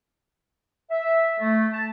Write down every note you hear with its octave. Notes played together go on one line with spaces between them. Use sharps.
E5
A3
A5